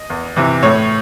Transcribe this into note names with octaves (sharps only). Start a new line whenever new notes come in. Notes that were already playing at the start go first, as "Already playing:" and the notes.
Already playing: D#5
E2
C3 E3
A2 C#5